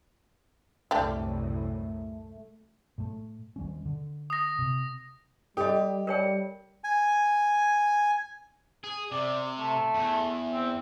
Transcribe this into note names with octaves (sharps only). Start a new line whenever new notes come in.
C2 F#2 A2 G3 A3 D4 G4
A2 A3
D#2 G3 C#4
D3
D#6 A#6
C3
G3 G4 A4 D#5
G3 A#4 C#5 G5
G#5
G#4
C3 D5
A3
E2
C4